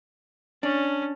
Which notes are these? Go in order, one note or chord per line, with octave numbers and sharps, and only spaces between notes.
C#4 D4